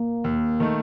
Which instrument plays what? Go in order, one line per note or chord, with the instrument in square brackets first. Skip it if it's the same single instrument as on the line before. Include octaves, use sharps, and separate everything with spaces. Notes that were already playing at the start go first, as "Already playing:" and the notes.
Already playing: [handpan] A#3
[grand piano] D#2
D#3 A3